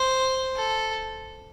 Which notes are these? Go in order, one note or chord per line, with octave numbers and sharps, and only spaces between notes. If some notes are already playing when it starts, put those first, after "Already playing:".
Already playing: C5
A4